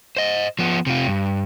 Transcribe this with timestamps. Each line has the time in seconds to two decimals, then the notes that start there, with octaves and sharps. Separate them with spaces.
0.17 C5 D#5
0.59 F3 B3
0.86 C3 F4
1.07 G2